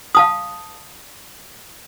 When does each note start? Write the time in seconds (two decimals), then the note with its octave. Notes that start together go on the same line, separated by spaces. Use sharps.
0.15 F5 A5 D#6